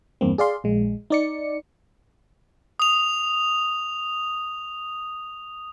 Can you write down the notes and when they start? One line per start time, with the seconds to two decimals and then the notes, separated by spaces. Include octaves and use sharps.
0.21 E2 G2 A#3 C4
0.38 G#4 D5 F5 C6
0.64 A#1 G#3
1.10 D#4 D5 C#7
2.80 D#6 F7